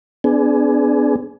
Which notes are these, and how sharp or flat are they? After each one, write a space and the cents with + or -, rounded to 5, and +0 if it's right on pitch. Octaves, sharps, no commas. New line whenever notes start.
B3 +35 D4 +0 G#4 +20